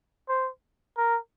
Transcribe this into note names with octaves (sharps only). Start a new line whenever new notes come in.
C5
A#4